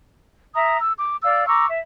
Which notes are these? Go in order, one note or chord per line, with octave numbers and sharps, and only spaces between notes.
E5 A#5 D#6
E6
D6
D5 F5 E6
A#5 C#6 D6 E6
E5